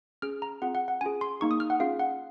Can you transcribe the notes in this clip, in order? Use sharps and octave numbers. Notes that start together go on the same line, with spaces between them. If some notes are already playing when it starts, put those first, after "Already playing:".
C#4 G#4 F6
A#5
C4 F4 G#4 F#5
F#5
F#5
C#4 F4 G#4 G#5
C6
A#3 D#4 G#4 C#6
D#6
F6
F#5
C#4 F4 G#4 F5
F#5